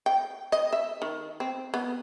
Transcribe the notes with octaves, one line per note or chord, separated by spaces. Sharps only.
G5
D#5
E5
D#3
C4
B3